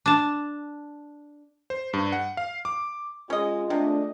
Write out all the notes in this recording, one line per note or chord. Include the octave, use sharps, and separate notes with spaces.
D4 A5
C5
G2
F#5
F5
D6
G#3 C#4 F4 D#5
C3 A3 D4 D#5